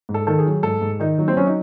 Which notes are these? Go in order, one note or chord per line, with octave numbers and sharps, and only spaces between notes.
G#2
A4
D#3 A4
G#4
F#3
G#2 A4
G#2
D#3 D#4
F#3
C4
F#3 C#4
D#4